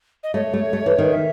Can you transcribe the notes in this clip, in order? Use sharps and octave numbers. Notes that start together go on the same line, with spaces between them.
D#5
A3 C#5
A3
A3
E3
D#3
E5